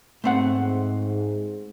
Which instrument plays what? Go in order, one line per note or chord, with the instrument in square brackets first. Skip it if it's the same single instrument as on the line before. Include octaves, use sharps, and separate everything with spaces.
[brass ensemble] G#2 [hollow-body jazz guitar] A3 C4 F#5